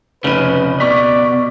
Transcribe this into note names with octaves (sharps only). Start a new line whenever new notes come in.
F1 C#3 F3 B4 D#7
B2 D5 C#6 B6